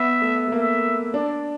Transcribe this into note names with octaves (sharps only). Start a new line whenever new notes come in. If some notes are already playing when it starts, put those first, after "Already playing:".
Already playing: B3 E5
A3
A3
A#3 E5
D4 D5